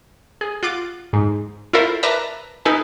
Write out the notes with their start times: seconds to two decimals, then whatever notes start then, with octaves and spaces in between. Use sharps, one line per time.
0.41 G#4
0.63 F4 F#5 D6 A6
1.13 G#2
1.73 E4 F4 A4 A#4 C5 E5
2.03 A#4 B4 D5 E5 A5 A#5
2.65 D#4 E4 A4 B4 G#5